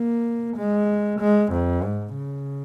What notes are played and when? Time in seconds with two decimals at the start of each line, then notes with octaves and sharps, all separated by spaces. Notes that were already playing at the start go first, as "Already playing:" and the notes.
Already playing: A#3
0.57 G#3
1.20 G#3
1.52 F2
1.84 G#2
2.16 C#3